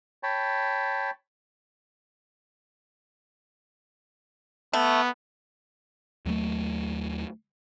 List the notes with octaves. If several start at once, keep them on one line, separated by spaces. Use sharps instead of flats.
C#5 G5 A5 B5
A3 B3
D#2 F#3 G3 A3